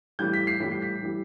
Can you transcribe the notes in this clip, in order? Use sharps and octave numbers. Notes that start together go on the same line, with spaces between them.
A2 E3 G3 G6
B6
C7
A2 E3 G3 B6
C7
B6
A2 E3 G3